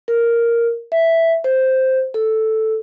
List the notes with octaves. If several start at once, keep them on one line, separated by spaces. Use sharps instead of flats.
A#4
E5
C5
A4